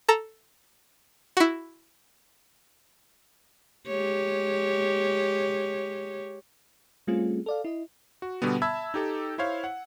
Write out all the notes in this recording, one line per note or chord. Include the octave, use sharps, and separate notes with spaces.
A4 A5 A#5
E4 F#4
G#3 G4 C#5
G3 A3 C4 C#4 F4 G#4
A4 D5 F5
E4 D#5
F#4
B2 D3 G3 B3
E5 A5 B5 E6 G#6
D#4 G4 A4
E4 C5 C#5 F5
F#5